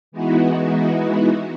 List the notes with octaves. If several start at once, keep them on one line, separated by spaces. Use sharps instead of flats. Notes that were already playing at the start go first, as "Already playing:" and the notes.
E3 G#3 B3 D#4 E4 F#4